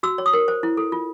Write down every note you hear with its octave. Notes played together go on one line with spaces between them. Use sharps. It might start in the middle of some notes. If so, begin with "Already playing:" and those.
F#4 E6
C#5
D#6
A#4
C5
E4
A4
F4